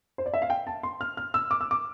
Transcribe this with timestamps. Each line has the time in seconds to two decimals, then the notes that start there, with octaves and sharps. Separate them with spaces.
0.18 C5
0.26 D5
0.34 E5
0.42 F5
0.50 G5
0.67 A5
0.83 C6
1.01 F6
1.17 F6
1.34 E6
1.51 D6
1.61 E6
1.71 D6